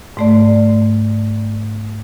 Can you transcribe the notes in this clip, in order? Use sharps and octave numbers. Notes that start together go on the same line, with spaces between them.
G#2 A3 D5